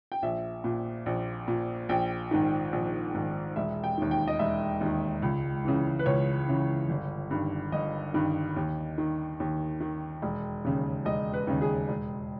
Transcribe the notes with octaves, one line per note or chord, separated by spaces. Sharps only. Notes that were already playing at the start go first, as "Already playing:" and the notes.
G5
A#1 E5
A#2
A#1
A#2
A#1 G5
G#2 D#3
A#1
G#2 D#3
E1 E5
G5
D#2 D#3
G5
D#5
E1 E5
D#2 D#3
C#2
C#3 E3
B4
C#2 C#5
C#3 E3
G1
G2 D#3
G1 D#5
G2 D#3
D#2
D#3
D#2
D#3
E1
D#2 C#3
E1 D#5
B4
D#2 C#3
G#4
E1